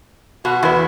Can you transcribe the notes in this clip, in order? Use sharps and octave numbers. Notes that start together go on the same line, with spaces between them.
B2 F#4
E2 B3 E4